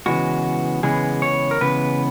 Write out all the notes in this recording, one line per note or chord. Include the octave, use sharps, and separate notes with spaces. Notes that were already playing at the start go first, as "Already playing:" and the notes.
C#3 E3 G#3 B3 F#4
C#3 E3 G#3 B3 G#4
C#5
A#4
C#3 E3 G#3 B3 B4